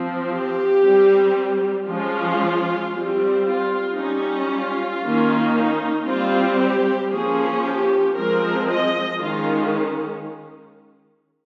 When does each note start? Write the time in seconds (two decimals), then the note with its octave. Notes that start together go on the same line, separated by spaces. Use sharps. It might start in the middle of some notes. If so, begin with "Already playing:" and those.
Already playing: F3 C4
0.31 G4
0.84 G3 C4
1.88 F3 G#3 C#4 F4
2.93 G3 C4
3.45 F4
3.98 G3 C#4 D#4
4.50 F4
5.03 D#3 A#3 C#4
5.55 D#4
6.07 G3 C4 F4
6.60 G4
7.13 F3 A#3 C#4 G#4
7.64 G4
8.17 F3 G#3 C4 A#4
8.70 D#5
9.21 D#3 G#3 C#4 F4